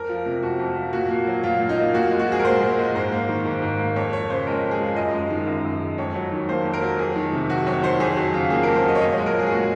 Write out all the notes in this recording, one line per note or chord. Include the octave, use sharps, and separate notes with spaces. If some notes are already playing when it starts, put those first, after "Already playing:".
Already playing: F2 A#4
F3
C3
F2 F#4
F2
F3
A#2 F#4
A#3
F#3
A#2 F4
A#2
D#4
A#3
A#2 F#4
G#3
F#4
F3 G#4
A#4
A#2 C5
A#2
G#3
G#2 C5
A#3
D#3
G#2
G#2
A#3
F2 C#5
F3 C#5
C#3 C5
G#3 A#4
F2
G#4
F3
F#2 D#5
G#3
D#3
F#2
F#2
G#3
F2 C#5
F#3
D#3
A#3 C5
F2
A#4
F#3
F2 G#4
D#3
C3
F#3 F#4
F2 C#5
D#3 C5
F2 G#4
F#3 F#4
C#3 F4
A#3 G#4
F2 A#4
C5
F#3 D#5
C#5
A#2 D#5
G#3 C#5
A#4
F3 G#4
G#4
A#2 F#4